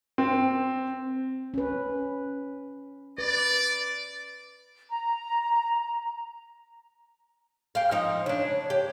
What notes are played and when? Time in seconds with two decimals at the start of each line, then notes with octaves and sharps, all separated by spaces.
0.18 C4
1.54 C#4 B4
3.18 B4 D5
4.90 A#5
7.75 G4 F5
7.91 F3 D#4
8.26 C#3 D4 C#5
8.70 G4